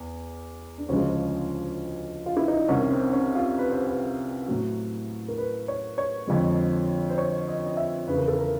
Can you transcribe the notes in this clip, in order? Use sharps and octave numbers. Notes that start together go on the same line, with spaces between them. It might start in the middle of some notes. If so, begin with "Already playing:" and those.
Already playing: E2
D4
D2 C#3 F3 G#3 C#4
F4
E4
D#4
D4
C2 C3 D#3 C#4
C4
C#4
F4
B4
C5
B4
A2 F#3
A#4
B4
C#5
C#5
F2 D3 F3 G#3
C5
C#5
D#5
D#5
E5
E2 C#3 E3 B4
A#4
A4
A#4